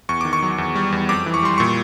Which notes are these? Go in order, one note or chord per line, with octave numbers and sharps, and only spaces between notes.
E2 C#6
D#3 D6
C#6
F#3
E2
G3
E2
F2 D6
E3
C#6
G3 C6
A#2 C#6